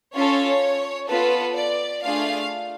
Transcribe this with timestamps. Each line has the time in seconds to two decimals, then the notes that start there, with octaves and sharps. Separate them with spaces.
0.14 C#4 F4 A4 C#5
1.08 B3 F4 A4 B4
1.56 D5
2.03 A3 D4 F4 G#4 F5